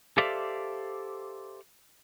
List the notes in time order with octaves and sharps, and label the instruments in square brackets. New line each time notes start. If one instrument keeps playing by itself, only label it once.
[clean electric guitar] G4 A4 C5 D5 E5 F5